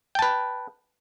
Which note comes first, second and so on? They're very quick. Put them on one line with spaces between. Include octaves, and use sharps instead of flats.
G5 A5 B4